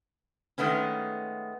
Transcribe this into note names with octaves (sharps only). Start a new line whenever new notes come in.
D#3 G#3 A3 B3 C#4